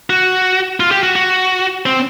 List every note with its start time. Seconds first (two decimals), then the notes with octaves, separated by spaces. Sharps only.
0.10 F#4
0.80 F4
0.91 G4
1.03 F#4
1.15 F#4
1.86 C4